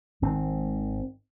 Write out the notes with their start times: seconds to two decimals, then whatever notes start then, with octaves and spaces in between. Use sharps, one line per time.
0.22 G#1 G#2 D#3 C4